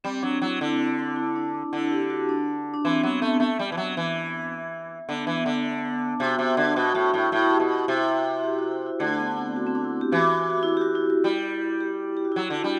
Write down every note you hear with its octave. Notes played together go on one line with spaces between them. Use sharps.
G3 C4
F#3 D4
F#3 E4
D3 E4
C4
D4
C4
E4
D4
D4
D3 E4
G4
F#4
D4
D4
E3 C4
F#3 B3
A3 B3
A3
G3
E3
F#3
E3
D3 B3
E3
B3
D3
C3 F#4
C3
D3
B2 F#4
A2 F#4
A2 E4
A2 E4
G4
B2
F#4
C3 E4
F#4
G4
F#4
E4
E4
D3 A3
B3
C4
F#4
C4
D4
E4
G4
E3 F#4
F#4
F#4
E4
F#4
G4
F#4
E4
F#4
G3 E4
G4
G4
F#4
E4
F#3 F#4
D3
G3